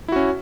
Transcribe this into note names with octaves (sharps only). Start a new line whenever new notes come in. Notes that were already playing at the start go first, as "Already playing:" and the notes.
C#4 E4 F#4